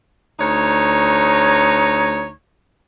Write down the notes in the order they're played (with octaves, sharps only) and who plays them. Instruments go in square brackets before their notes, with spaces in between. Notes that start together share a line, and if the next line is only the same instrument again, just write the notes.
[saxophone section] D2 D#4 C#5